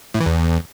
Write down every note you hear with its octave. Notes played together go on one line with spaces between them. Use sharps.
A2
E3
E2